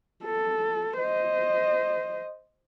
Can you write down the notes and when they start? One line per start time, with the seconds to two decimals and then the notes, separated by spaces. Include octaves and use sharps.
0.24 A4
0.99 C5 D#5